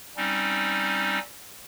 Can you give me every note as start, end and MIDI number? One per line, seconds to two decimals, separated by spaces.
0.17 1.19 55
0.17 1.19 60
0.17 1.19 61
0.17 1.19 63